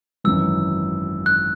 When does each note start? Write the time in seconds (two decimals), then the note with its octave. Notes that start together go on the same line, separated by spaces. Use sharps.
0.24 G#1 F#2 E3 E6
1.26 F#6